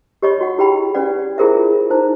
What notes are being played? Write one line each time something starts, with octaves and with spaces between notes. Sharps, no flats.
G4 C#5 D#5 B5 C#6
F#4 F#5
E4 G4 G#4 G5 B5
C#4 B4 D5 F#5
E4 F4 G#4 A#4 C5 E5
D#4 E4 C5